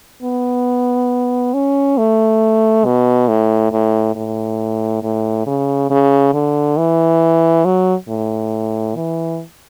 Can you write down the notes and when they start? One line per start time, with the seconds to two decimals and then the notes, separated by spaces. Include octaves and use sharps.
0.23 B3
1.54 C#4
1.98 A3
2.85 B2
3.28 A2
3.72 A2
4.16 A2
5.03 A2
5.47 C#3
5.91 C#3
6.34 D3
6.77 E3
7.65 F#3
8.08 A2
8.96 E3